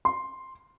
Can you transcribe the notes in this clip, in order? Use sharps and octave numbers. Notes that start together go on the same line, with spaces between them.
C6